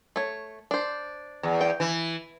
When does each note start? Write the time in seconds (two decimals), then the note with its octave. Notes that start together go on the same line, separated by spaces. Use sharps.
0.16 A3 C#5
0.71 D4 C5
1.43 E2
1.61 G5
1.80 E3